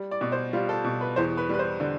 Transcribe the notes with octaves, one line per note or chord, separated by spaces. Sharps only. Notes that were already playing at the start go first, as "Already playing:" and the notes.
Already playing: G3
D5
B2
C5
G3 F4
A4
B2
B4
E2 C5
B4
G3 B4
C5
D3